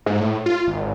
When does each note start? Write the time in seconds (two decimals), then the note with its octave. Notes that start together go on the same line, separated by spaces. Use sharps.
0.06 G#2
0.20 A2
0.46 F4
0.67 G#1